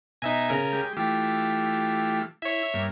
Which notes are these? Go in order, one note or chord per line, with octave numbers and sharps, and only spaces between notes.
B2 D#4 E5 G#5 A#5
C#3 A#4 G#5
G#3 G4
E3 A3 F4 G4
E4 C#5 E5
G2 A#3